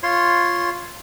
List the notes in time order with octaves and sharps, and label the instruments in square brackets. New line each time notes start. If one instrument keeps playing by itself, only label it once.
[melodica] F4 C#5 C6